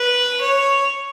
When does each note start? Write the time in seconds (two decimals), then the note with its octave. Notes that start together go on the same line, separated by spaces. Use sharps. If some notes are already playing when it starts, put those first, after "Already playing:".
Already playing: B4
0.42 C#5